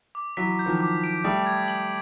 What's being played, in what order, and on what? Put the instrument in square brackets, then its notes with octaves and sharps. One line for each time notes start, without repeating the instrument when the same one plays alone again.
[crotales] D6
[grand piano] E3 F#3 [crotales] B6
[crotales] G6
[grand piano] D#3 F3
[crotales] D6
D7
[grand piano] G3 A3 [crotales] D#6
[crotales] G#6
F#7